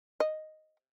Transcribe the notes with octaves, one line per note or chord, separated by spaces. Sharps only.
D#5